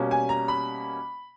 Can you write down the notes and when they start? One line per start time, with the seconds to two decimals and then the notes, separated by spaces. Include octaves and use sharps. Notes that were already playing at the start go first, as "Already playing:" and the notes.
Already playing: B2 G3 A#3 C#4
0.11 G#5
0.29 A#5
0.48 B5